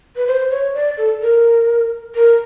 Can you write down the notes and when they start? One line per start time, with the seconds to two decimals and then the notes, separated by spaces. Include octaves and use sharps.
0.16 B4
0.27 C5
0.50 C#5
0.74 D5
0.97 A4
1.21 A#4
2.15 A#4